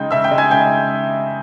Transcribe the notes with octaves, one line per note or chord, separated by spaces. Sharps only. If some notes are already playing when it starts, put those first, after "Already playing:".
Already playing: C#3 G#3 D#4 G5 G6
C#3 E5 E6
G5 G6
G#3 D#4
G#5 G#6
C#3 G5 G6